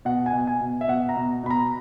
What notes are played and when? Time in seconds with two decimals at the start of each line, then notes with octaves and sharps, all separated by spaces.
0.05 B2 F#5
0.26 G#5
0.33 B2
0.47 G#5
0.61 B2
0.81 E5
0.88 B2 F#5
1.09 A#5
1.16 B2
1.43 B2 B5
1.50 A#5